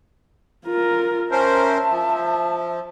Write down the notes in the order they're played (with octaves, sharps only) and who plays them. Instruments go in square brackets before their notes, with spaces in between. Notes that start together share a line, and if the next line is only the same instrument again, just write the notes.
[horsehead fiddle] F4 A#4
[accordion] C#4 A#4 C5 [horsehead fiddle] E5 [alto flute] A5
[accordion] F3